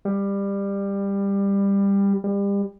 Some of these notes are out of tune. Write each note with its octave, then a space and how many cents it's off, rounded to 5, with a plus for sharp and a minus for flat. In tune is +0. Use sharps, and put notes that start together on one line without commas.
G3 +20
G3 +35